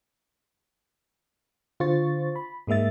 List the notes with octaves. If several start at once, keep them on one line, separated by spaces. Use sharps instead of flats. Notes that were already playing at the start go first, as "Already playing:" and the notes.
D3 F4 C5 C#6 A6
B5
G#2 G#3 A#3 E5 A6